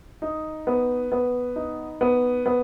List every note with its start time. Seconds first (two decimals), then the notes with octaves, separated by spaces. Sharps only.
0.22 D#4
0.67 B3
1.12 B3
1.56 D#4
2.01 B3
2.46 B3